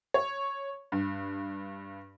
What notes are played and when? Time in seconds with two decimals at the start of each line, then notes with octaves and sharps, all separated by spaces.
0.14 C#5
0.92 G2